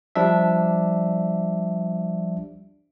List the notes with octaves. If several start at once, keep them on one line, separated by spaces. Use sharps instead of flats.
F3 G3 D4 E5